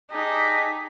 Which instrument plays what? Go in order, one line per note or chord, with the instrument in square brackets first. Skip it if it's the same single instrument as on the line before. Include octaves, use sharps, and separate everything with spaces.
[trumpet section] D4 G4 G#4 [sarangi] D#4 [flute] B6